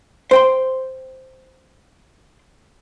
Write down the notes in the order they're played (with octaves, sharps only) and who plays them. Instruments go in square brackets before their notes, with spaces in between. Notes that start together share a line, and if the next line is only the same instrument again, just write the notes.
[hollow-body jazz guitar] C5 G5 C6